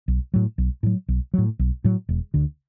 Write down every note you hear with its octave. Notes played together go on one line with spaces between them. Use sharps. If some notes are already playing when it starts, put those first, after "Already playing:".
B1
A2 F#3
B1
A2 F#3
B1
A2 F#3
B1
A2 F#3
E1
D2 D3